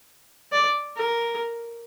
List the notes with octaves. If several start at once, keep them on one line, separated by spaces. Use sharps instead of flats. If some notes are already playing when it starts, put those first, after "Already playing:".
D5
A#4